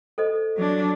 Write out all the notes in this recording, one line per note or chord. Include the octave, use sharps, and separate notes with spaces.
A4 C5 D#5
F#3 D4